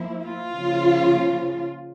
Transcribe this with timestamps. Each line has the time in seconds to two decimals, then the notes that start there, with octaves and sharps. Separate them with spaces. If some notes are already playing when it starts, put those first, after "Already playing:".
Already playing: F3 A#3 E4
0.24 F4
0.54 C#3 F3 A#3